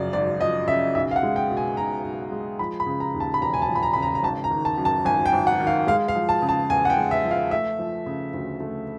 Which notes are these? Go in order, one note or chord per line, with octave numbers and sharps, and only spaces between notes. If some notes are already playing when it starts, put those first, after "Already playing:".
Already playing: F#2 C#3 F3 D5
G#1 D5
F3 D#5
C#3 E5
B1 E5
F5
F#5
G#3
G5
B2
G#5
B1 A#5
B1
G#3
F3 B5
B5
C#3
A#5
D#2
A5
B5
E1 A#5
G#5
A5
F3
B5
A#5
C#3 B5
A#5
A#5
G#1 A5
A#5
D#3
A5
F#2
A5
G#1 G#5
G5
G#1
F#5
D#3
F5
G#3 F5
F5
F3
A5
C#3
A5
E2 G#5
F#5
G5
G#3
E5
F3
F5
A3 E5
F3
C#3
D2
A3